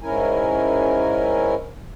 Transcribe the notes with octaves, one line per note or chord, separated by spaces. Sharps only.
G#2 C#4 E4 A#4 G#5